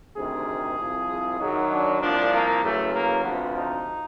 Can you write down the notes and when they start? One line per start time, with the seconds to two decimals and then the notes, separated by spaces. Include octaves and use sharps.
0.16 D2 C3 D#3 G#4
0.78 C2 C3 F3
1.39 F#2 D#3 F#3 D#4
1.71 D4
2.01 C2 A#2 F3 D4
2.32 A#3
2.63 E2 C#3 F#3 A3
2.94 A#3
3.24 D2 C3 F3 B3
3.55 D#4